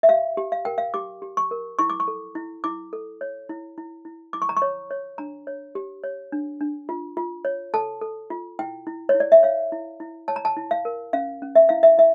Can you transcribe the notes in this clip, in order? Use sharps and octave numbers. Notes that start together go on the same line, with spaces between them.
E5
G4 F5
G4
F5
A#4 G5
F5
G4 D6
G4
C#6
A#4
E4 C#6
D6
C#6
A4
E4
E4 D6
A4
C#5
E4
E4
E4
E4 D6
C#6
A#5
C#6
C#5
C#5
D4 A#5
C#5
G4
C#5
D4
D4
F4
F4
C#5
A4 A5
A4
F4
E4 G5
E4
C#5
E4
D5
E5
C#5 F5
E4
E4
C#5 A5
A#5
A5
E4
F5
A#4
C#4 F5
C#4
E5
E4 F5
E5
E4 E5